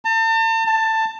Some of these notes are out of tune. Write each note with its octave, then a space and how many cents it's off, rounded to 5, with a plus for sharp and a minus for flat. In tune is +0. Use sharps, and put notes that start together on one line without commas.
A5 +40
A5 +15